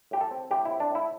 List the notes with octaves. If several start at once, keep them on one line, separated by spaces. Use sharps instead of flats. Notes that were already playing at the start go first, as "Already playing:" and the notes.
A2 G4
A4
C4
A2 G4
C4 E4
D4
A2 E4